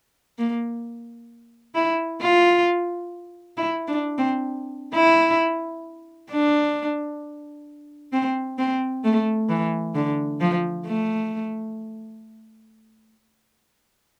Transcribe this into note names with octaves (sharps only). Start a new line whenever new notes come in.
A#3
E4
F4
E4
D4
C4
E4
D4
C4
C4
A3
E3
D3
F3
A3